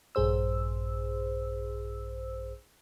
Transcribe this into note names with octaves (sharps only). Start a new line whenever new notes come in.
A#1 G2 G#4 C5 E6